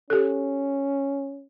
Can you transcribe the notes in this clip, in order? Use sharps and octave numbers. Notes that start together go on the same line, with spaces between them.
C#4 G4 A4